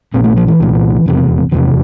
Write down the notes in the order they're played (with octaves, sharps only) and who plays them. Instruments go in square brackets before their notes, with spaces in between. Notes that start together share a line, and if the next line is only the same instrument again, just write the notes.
[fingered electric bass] A#1 A#2 C4
A3
F3
E3
C2 A#2
F1 E2 C3
F1 E2 C3 E3